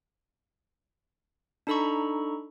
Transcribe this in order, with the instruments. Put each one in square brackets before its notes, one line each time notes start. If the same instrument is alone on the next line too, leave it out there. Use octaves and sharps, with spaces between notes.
[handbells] D4 D#4 A4 A#5 B5 C#6